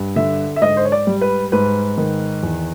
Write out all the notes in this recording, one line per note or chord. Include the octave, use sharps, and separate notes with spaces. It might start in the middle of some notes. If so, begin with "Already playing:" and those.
Already playing: G2
D3 E5
E5
G#2 D#5
C5
C#5
D5
G3
B4
G#2 B4
D#3
E2